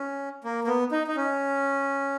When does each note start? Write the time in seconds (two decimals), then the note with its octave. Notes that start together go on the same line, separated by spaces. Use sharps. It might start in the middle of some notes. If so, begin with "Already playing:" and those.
Already playing: C#4
0.44 A#3
0.64 A#3
0.67 B3
0.92 D#4
1.07 D#4
1.16 C#4